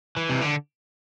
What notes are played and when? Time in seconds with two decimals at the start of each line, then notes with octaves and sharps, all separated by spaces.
0.17 E3
0.29 C3
0.41 D3